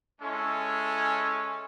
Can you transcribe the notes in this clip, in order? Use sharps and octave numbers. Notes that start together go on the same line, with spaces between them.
G#3 C#4 E4 A4